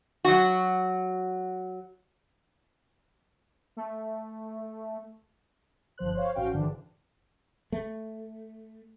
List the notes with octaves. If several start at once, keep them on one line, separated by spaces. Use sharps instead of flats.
F#3 F#4
A3
G1 F3 C5 F#6
C5 C#5 F5
A1 C#4 F#4 F5 G5
G#2 D3 E3 D4
A3